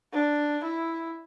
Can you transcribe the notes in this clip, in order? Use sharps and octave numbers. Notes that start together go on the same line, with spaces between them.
D4
E4